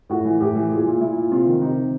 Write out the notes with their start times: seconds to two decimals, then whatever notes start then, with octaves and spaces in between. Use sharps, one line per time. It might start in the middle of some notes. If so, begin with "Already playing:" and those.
0.09 A2 F#4
0.25 E3
0.40 A2 G4
0.55 E3
0.70 A#2 G#4
0.86 A#2
1.01 A#2 E4
1.17 A#2
1.31 C3 F4
1.46 D#3
1.61 C3 D#4
1.77 D#3